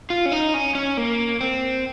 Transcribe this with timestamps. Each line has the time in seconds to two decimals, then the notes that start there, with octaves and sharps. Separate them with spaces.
0.10 F4
0.26 C#4
0.32 D#4
0.54 C#4
0.75 C#4
0.97 A#3
1.41 C4